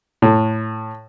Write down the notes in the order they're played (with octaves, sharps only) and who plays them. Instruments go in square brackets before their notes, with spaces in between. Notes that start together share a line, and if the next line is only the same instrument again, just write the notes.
[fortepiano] A2